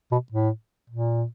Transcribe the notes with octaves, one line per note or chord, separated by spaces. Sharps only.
B2
A2
A#2